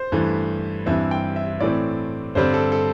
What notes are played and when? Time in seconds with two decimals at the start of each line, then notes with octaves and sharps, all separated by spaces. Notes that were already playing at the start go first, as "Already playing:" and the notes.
Already playing: C5
0.12 G2 E3 A3
0.86 G2 E3 C4 E5
1.11 G5
1.36 E5
1.60 A2 E3 A3 C4 D5
2.35 G2 D3 G3 C4 C5
2.54 A4
2.72 A4